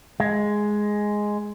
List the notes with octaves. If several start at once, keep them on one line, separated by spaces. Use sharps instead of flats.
G#3